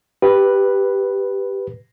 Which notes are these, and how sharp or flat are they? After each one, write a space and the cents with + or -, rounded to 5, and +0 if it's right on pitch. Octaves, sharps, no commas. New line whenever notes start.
G4 +0 B4 +0